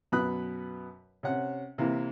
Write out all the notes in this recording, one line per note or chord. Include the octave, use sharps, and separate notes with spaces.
F#2 B2 B3 B5 D#6 F#6
C3 C#4 F#5
C3 E3 A#3 E4